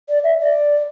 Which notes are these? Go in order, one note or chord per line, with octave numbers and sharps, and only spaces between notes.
D5
E5
D5